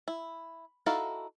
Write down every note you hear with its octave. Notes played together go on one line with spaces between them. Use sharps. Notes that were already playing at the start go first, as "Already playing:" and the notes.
E4
D#4 E4 F#4 A4 F5